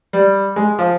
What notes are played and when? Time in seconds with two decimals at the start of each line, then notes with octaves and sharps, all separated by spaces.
0.13 G3
0.56 G#3
0.79 F3